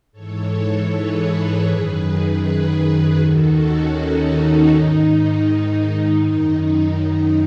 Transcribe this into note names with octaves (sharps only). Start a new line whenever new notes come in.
G#2 E3 A4 C#5
G#4 B4
F#2 D#3
G#4 B4
D#2 D#3 F#4 A4
C#4
D#4
G#2 D#3
F#2 D#3
D#4